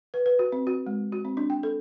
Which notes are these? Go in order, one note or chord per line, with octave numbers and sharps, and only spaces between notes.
B4
B4
F#4
C4
F#4
G#3
F#4
C4
D4
G5
A4